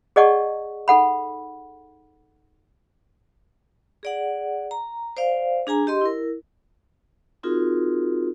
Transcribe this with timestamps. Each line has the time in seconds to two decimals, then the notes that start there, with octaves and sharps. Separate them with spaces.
0.16 G#4 D5 D#5 F#5 A5 C#6
0.88 D#4 A4 F#5 B5
4.03 G#4 D5 F#5
4.71 A#5
5.17 C5 D5 F5
5.67 D4 G#4 G#5 A#5
5.87 G4 D#5 C6
6.01 E4 A#4
7.43 C4 D#4 F4 F#4 G#4 A#4